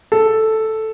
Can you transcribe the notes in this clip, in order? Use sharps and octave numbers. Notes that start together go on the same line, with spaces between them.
A4